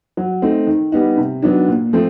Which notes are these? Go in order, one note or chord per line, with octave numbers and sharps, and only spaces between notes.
F#3
A3 C4 D#4
D#3
G3 B3 D#4
C3
D#3 F#3 B3 D4
A#2
F3 A3 C4